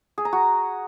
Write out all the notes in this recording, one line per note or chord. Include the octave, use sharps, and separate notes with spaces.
G#4
A#5
F#4